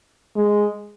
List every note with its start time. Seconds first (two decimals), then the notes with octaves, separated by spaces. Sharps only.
0.36 G#3